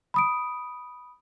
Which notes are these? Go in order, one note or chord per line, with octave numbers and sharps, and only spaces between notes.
B5 D#6 D7